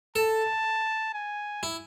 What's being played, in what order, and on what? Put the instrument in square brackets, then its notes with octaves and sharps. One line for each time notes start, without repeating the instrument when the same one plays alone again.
[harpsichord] A4 [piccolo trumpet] A5
[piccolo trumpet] G#5
[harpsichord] E4